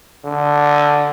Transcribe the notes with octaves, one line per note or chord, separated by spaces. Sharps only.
D3